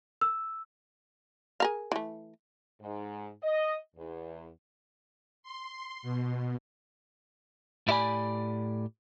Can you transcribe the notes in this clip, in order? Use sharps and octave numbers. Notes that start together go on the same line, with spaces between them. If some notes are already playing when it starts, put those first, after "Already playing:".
E6
G#4 A#4 F5
E3 A3
G#2
D#5
E2
C6
B2
A2 E4 G4 D5 G#5 B5